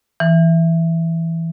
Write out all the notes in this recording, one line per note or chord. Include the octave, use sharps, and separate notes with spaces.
E3